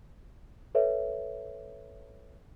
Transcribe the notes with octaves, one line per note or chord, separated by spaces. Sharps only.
A4 B4 C#5 E5